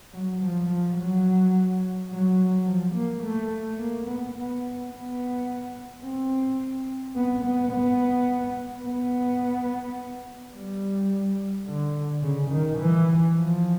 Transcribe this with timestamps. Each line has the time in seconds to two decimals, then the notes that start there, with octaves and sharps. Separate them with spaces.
0.13 F#3
0.42 F3
0.69 F3
0.98 F#3
2.11 F#3
2.66 F3
2.95 A#3
3.23 A3
3.79 A#3
4.07 B3
4.36 B3
4.92 B3
6.04 C4
7.16 B3
7.45 B3
7.73 B3
8.85 B3
10.54 G3
11.66 D3
12.23 C#3
12.51 D#3
12.79 E3
13.35 F3